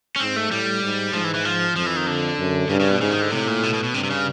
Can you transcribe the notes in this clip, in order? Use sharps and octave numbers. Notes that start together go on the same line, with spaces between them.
C#4
G#2 C4
A3
A2 G3
G#2
G#2 F3
E3
E3
F3
F2 F3
E3
D#3
D3
F#2
G2 C#3
C#3
B2
G#2 C#3
D#3
D3
A2 C3
A#2
B2
B2
B2
G2 C3
C3
C#3